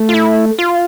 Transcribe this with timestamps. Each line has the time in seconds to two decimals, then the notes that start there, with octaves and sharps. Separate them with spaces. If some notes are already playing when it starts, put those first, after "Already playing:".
Already playing: A3
0.09 F4
0.14 E4
0.59 F4